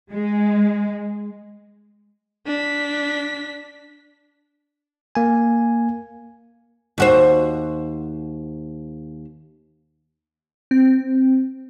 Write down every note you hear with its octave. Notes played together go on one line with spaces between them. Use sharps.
G#3
D4 B6
A#3 G#5
D#2 F#4 C5
C4